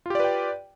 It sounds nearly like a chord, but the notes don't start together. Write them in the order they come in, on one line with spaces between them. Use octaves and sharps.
F4 G4 D5 B4 G5